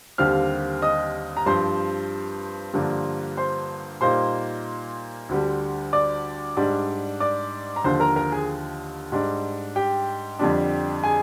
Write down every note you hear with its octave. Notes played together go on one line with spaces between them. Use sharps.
D#2 D3 G3 C4 F5 F6
D#5 D#6
A#5
G2 F3 C4 C5 C6
G2 D3 F3 A#3 D4
C5 C6
A#2 G3 A#3 D#4 C5 C6
D2 D3 G3
D5 D6
G#2 G3 D4
D5 D6
A#5
D#2 D3 F3 C5 C6
A#4 A#5
A#4 A#5
G#4 G#5
G#2 G3 D4
G4 G5
F2 D3 G3 D4
G#4 G#5